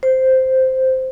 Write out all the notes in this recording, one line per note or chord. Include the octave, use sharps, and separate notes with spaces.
C5